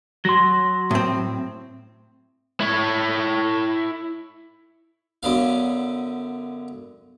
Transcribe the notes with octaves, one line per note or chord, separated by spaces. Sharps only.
F#3 C6 A#6
A2 C4
E4 C#5
F#2 D3 B3 F5